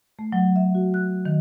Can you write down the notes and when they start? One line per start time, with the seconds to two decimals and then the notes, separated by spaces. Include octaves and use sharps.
0.19 A3
0.33 F#3
0.56 E5
0.75 F#4
0.94 F#6
1.25 D#3